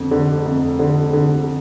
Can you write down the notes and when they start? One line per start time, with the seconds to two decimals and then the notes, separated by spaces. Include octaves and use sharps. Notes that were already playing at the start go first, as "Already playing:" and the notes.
Already playing: F2 D3
0.11 D3
0.46 F2
0.79 D3
1.13 D3